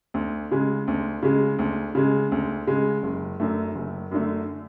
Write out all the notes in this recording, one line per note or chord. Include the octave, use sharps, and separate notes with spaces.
D2
C#3 G#3
D2
C#3 G#3
D2
C#3 G#3
D2
C#3 G#3
F#1
F#2 D3 A3
F#1
F#2 D3 A3